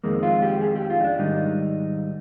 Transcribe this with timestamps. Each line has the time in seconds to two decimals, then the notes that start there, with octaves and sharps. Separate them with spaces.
0.04 F2 D#3 G#3 A#3
0.23 F4
0.42 G4
0.61 G#4
0.76 G4
0.90 F4
1.00 D#4
1.04 D4
1.19 G#2 D#3 G3 D#4